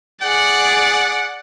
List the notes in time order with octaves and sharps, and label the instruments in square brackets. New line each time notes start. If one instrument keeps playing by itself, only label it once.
[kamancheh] G#4 [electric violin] D5 [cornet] F#5